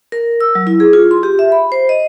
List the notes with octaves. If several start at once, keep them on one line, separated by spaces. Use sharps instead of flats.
A#4
E6
F#3
E4
G#4
F4
C6
G4
E5
B5
C5
D#5